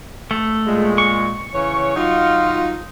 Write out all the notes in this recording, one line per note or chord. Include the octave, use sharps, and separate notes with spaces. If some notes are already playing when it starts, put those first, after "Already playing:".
A3
A#2 G#3
C#6
C#3 E3 C#5
F#3 D#4 F4